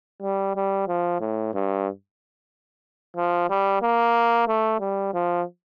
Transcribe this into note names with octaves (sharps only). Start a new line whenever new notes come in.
G3
G3
F3
A2
G2
F3
G3
A#3
A3
G3
F3